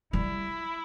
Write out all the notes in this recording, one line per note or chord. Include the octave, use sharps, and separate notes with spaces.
G3 E4